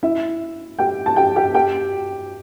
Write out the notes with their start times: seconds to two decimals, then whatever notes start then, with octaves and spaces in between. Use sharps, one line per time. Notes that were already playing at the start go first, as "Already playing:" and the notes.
0.03 E4 E5
0.79 G4 G5
1.06 A5
1.16 G4 G5
1.36 G4 G5
1.54 G4 G5